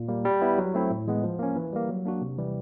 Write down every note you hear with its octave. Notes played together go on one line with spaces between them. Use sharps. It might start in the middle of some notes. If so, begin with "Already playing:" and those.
Already playing: A#2
G3 A#3
G3
B3 E4
F#3
A3 C4 E4
A2
E3 G#3 B3
F3
A#3 C#4
E3
G3 A#3
F#3
A#3 D4 F#4
C3
E3 G3